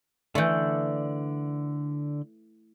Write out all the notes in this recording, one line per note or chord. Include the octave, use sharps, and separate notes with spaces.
D3 E3 A3 D5 G6